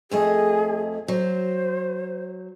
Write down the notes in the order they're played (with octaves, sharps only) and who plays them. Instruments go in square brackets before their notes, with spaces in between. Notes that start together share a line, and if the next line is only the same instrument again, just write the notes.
[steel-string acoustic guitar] F2 A3 D#5 [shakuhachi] G#4
[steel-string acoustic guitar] F#3 [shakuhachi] C5